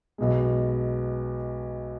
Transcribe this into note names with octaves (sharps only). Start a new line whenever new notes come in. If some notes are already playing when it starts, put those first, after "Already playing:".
B1 B2 G#3